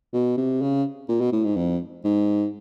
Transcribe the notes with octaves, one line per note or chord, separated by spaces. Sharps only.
B2
C3
C#3
A#2
B2
A2
G#2
F2
G#2